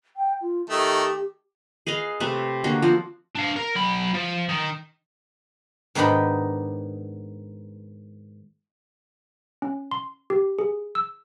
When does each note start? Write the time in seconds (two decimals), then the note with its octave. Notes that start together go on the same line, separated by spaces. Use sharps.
0.17 G5
0.41 F4
0.70 D#3 A3 G4
1.87 G#4 B4 D#5 F5
2.20 C3 A3 B4 E5
2.64 D3 A#3 F#4 C#5
2.82 F3 C4 F#4
3.35 D4 F5
3.56 A#4
3.75 F#3 B5
4.14 F3
4.49 D#3 D#4
5.95 G#2 D#3 B3 D4 D#4 B5
9.62 C#4
9.91 C6
10.30 G4
10.59 G#4
10.95 E6